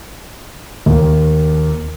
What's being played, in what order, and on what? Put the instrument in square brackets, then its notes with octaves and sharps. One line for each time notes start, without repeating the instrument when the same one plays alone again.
[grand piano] D#2